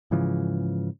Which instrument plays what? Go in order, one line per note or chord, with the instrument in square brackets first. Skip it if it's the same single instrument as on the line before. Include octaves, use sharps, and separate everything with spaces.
[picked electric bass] G#2 C#3 E3 F3